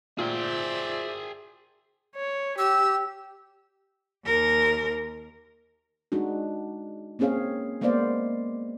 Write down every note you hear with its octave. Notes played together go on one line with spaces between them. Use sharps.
A#2 F4 G#4 C5 D5 E5 G5
C#5
G4 E6
D#2 A#4
G#3 D4 D#4 F#4
A#3 C4 C#4 G#4 C#5 F5
G#3 A#3 B3 C5 D5 F5